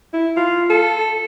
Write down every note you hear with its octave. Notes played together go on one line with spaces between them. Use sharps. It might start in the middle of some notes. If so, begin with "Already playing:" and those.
E4
F4
A4